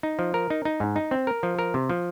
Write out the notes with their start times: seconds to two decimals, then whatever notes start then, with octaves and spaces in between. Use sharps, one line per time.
0.03 D#4
0.19 F3
0.34 A#4
0.50 D#4
0.65 D#4
0.80 G#2
0.96 D#4
1.11 C4
1.27 A#4
1.43 F3
1.59 A#4
1.74 C3
1.90 F3